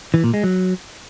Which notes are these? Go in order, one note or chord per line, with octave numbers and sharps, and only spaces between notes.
E3
A#2
G#3
F#3